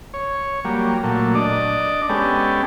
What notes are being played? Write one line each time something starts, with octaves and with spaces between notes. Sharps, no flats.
C#5
F#3 G3 A#3
A#2 F#3 A3
D4 D5 D#5
G#3 B3 C#4 G4 A4